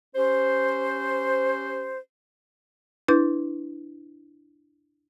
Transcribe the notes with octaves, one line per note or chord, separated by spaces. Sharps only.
C#4 G4 C5
D4 E4 B4 G6